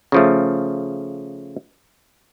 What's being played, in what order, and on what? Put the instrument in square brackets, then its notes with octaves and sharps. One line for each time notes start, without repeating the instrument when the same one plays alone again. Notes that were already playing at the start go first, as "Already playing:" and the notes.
[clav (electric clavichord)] C#3 F3 A3